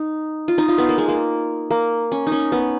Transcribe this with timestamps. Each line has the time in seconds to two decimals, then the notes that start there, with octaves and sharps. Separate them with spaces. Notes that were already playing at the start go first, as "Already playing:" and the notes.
Already playing: D#4
0.48 F4
0.58 D#4
0.68 F4
0.78 B3
0.89 A#3
0.98 G#3
1.08 A#3
1.71 A#3
2.12 C#4
2.27 D#4
2.32 C#4
2.52 B3